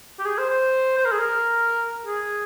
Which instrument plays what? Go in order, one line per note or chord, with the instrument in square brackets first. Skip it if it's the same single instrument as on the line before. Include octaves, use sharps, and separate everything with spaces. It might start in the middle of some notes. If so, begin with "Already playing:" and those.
[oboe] G4
G#4
C5
C5
C5
A#4
G#4
A#4
G#4